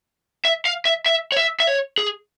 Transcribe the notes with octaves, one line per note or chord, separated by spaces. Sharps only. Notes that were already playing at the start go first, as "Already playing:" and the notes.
E5
F5
E5
E5
C#5
E5
E5
C#5
G#4